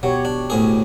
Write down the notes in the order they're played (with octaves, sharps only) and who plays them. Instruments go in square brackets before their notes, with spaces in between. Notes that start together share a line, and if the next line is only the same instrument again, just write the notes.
[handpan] B2 G4 C#5 [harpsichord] F#3
[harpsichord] D4
D2 A2 G#4